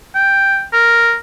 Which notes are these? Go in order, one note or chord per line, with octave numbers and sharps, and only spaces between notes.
G5
A#4